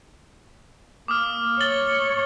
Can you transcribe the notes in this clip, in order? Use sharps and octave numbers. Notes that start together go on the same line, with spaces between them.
A#3 D6 D#6 F6
C#5 A6 F#7 G7